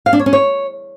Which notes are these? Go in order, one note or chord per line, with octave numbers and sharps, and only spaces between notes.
F5
D4
C#5
C#4
C#5